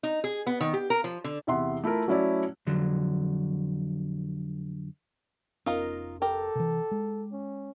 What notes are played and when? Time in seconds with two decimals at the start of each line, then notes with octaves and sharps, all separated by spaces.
0.03 D#4
0.24 G#4
0.47 B3
0.60 D#3
0.73 G4
0.90 A#4
1.04 F3
1.24 D3
1.47 E2 C3 E5 F#5 C6
1.84 A3 E4 F4 A#4
2.08 F#3 A3 C#4 E4 F#4 D5
2.67 F2 D3 F#3
5.66 F1 B3 C#4 D#4 F4 A#4
6.22 G4 A4 A#4
6.55 C3 E3
6.91 G#3
7.32 C#4